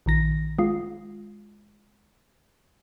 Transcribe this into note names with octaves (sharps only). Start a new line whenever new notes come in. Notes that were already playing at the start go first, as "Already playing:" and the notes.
A#1 D#3 A#6
G#3 F4